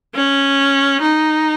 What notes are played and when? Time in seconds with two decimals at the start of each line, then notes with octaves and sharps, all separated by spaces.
0.15 C#4
1.02 D#4